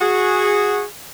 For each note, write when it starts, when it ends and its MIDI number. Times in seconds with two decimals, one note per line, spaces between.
0.01 0.83 66
0.01 0.83 68